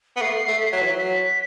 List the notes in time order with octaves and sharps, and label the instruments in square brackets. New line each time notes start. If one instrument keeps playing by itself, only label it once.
[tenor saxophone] B3
[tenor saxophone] A3 [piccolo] C7
[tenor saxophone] A3
[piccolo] B6
[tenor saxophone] F#3
E3
F#3
[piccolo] B6